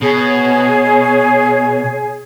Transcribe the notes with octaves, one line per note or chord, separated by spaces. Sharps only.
B2 G#4 C#5